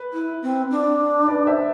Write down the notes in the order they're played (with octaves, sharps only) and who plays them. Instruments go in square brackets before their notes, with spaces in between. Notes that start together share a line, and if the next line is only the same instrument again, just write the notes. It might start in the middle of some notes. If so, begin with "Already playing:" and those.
Already playing: [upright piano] B4
[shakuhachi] E4
C4
D4
[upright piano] B4 D5
C5 E5